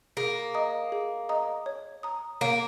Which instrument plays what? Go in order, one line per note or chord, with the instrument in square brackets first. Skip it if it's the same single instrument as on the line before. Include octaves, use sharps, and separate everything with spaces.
[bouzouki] A#3 [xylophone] G#4
[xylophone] D#5 A#5 D#6
G#4
D#5 A#5 D#6
C#5
A#5 D#6
[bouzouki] A#3 [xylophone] C#5